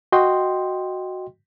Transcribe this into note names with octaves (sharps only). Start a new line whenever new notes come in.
F#4 D#5 G5 C6